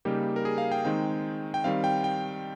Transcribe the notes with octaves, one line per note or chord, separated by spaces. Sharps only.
C#3 G3 A#3 D#4 G4
A#4
G#4
F5
G5
D#3 G#3 C4 D#4 G5
G5
D#3 G3 C4 F5
G5
G5